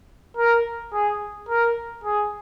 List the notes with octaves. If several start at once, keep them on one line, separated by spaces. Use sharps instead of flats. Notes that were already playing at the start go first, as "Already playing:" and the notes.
A#4
G#4
A#4
G#4